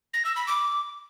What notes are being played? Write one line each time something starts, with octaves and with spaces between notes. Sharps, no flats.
A#6
E6
B5
D6